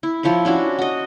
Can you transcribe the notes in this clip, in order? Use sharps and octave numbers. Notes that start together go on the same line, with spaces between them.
E4
F3 E4 C#5 B5
C#4 D4 E4 F#4
F#4 D#5